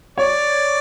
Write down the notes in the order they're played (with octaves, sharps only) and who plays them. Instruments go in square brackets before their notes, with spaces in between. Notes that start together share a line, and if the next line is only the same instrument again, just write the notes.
[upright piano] C#5 [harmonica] D5